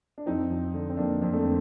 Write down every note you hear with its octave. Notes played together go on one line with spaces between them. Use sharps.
D4
F2 C4 D#4
F3
D3
C4
F2 A#3 D4
F2 D4
A3 C4
D3